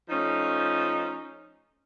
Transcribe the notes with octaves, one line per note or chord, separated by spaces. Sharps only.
F3 A3 C#4 D#4